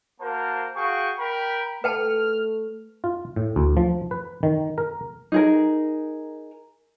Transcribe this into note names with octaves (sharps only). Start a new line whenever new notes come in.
A#3 F#4 A#4 C5 A5
F#4 G#4 F5 G5 C#6
A#4 G5 B5
A3 B4 G5 A5 F6
F4
A2
D2
F3
B4
D#3
A#4
D#4 G#4 A#4